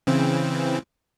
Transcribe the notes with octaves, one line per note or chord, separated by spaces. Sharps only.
C#3 E3 C4